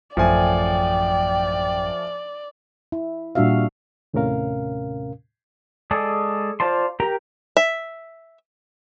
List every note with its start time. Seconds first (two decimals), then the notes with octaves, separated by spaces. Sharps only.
0.17 A1 F#2 F3 A3 D5 G5 G#5
2.92 E4
3.35 A#2 G3 D4 F#4 E5 F5
4.14 D#2 A2 C3 C#4 A#4 F5
5.91 G#3 G#4 A4 D5
6.60 F4 C5 D5 A5 C6
7.00 G4 A#4 G5 A#5
7.57 E5